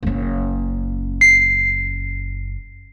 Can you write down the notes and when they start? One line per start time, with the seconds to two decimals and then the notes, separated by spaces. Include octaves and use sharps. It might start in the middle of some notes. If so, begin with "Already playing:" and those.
0.03 F#1 C#4
1.21 C7